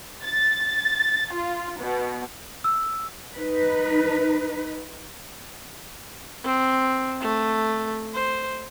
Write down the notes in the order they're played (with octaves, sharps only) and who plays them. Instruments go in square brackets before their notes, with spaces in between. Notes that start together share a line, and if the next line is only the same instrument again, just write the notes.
[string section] A6
F4
B2
[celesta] E6
[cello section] D#4 B4
[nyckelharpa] C4
A3
C5